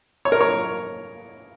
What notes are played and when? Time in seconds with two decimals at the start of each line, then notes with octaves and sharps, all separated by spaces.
0.25 C#5
0.32 A#4
0.41 C#5